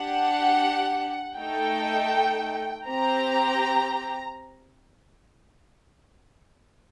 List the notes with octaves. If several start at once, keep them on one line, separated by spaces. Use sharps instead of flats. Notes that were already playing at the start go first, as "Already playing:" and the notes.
Already playing: D4 G4 F#5
A3 D#4 A4 G5
C4 G4 A#5